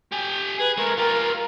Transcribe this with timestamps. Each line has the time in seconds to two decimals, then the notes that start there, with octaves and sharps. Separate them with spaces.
0.12 G4 G#5
0.59 G#4 B4
0.77 G#3 A3 A#4
0.97 F4 G4 A#4